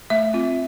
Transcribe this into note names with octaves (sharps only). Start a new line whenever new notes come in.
A3 E5
C4 F4